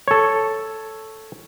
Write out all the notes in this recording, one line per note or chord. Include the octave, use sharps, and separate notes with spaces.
A4 C#5